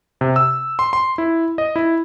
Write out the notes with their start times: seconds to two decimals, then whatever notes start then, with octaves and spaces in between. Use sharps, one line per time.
0.21 C3
0.36 E6
0.79 C6
0.93 C6
1.18 E4
1.58 D#5
1.76 E4